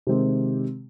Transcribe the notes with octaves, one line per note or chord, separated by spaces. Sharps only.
C3 D#3 G#3 C4 G4